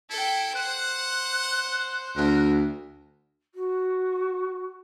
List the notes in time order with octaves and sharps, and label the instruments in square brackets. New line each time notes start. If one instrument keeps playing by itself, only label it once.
[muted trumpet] E4 [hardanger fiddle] A4 G5
[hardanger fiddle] C5 [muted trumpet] F#5 [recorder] F#6
[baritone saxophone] D2 [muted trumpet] A#4
[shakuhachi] F#4